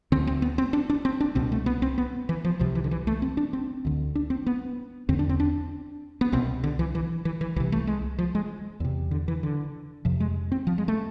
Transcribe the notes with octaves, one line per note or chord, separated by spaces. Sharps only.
D2 D3 C4
C4
B3
C4
D4
D4
C4
D4
C2 B2 C4
A3
B3
C4
B3
E3
F3
C2 C3 F3
E3
D3
E3
A3
C4
D4
C4
D2 D3
D4
C4
B3
E2 D3 C4
D4
C4
D4
B3
C2 B2 C4
D3
E3
E3
E3
E3
C2 C3 E3
A3
G#3
F3
G#3
E2 C3
D3
E3
D3
F2 C3 F3
G#3
C4
F3
G#3
A3